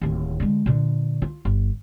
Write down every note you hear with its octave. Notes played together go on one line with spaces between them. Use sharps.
D1 D#2
D3 G#3
A#2 D3
F4
G1